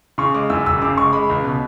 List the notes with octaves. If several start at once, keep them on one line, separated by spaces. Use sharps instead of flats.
C#3 C#6
G#3 D6
F#2 E6
F#1 E6
C#3 D6
G#3 C#6
G#3 B5
C#2
B2